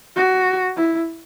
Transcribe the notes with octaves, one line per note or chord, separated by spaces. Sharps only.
F#4
E4